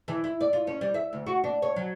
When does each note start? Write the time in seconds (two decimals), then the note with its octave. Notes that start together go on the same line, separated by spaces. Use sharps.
0.08 E3
0.24 E4
0.41 D5
0.53 F4
0.67 C#4
0.81 G3
0.94 E5
1.13 D2
1.26 F#4
1.44 D4
1.62 C#5
1.76 F#3